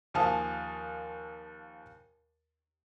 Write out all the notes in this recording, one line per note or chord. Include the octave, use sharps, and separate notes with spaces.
D#2 F3 F5 G#5 A5 D#6